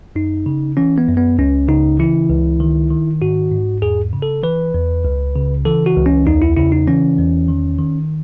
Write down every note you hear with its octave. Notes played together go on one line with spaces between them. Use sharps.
F#2 D#4
C#3
E3 C#4
B3
F#2
B3
C#2 C#4
C#3 D#4
E3 E4
C#2
D#3
D#3
G#2 F#4
G#2
E2 G#4
C#3
A4
E3 B4
E2
C#2
C#3
E3 A4
F#4
C#2
C#4
E2 D#4
E4
C#3 E4
D#4
E3 C#4
E2
D#3
D#3